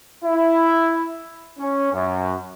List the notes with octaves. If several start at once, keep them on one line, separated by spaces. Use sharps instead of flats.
E4
C#4
F#2